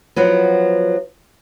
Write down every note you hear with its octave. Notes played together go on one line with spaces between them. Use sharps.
F3 F#3 B3